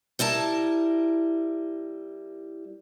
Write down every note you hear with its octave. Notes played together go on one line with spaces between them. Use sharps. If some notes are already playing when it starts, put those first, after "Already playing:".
G3 E4 A#4 A5